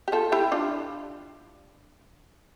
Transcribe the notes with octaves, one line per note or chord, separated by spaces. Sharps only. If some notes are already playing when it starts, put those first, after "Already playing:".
G4
F4 A4
E4 G4
D4 F4